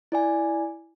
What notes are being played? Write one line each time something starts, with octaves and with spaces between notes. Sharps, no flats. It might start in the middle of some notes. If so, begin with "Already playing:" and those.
E4 D5 G#5